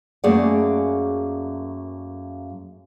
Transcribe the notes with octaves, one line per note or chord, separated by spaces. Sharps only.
F#2 A3 A#3 G#4 D5 F#5